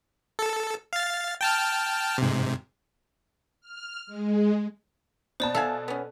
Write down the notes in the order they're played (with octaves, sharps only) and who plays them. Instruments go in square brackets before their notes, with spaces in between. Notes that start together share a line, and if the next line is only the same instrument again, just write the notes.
[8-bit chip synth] A4
F5 A6
G5 A5 F6
G#2 C3
[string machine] F6
G#3
[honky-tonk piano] B2 A5 [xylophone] C5 D5
[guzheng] A4 [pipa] E5 F5 G#5
[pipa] B3 C#4